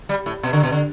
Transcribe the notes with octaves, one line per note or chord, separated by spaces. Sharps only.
G3
A2
B2
D3
B2
D3